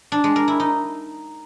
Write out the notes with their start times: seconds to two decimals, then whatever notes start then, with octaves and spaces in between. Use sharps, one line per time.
0.12 D4
0.24 G#3
0.36 A#4
0.48 E4
0.60 D#4